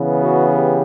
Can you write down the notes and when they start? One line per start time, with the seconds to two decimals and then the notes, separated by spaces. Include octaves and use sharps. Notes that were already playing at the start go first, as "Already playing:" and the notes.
Already playing: C#3 E3 B3
0.21 F#4
0.53 G4